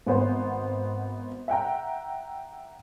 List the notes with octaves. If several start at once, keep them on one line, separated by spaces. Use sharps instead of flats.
G#1 B3 C5 F#5
E5 F#5 G5 A#5